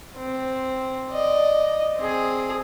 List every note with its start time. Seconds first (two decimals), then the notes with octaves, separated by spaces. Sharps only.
0.17 C4
1.11 D5 D#5
1.97 C4 G#4